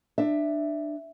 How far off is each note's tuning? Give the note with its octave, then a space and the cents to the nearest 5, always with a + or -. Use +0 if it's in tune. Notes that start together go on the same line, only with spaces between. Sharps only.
D4 +20 E5 +0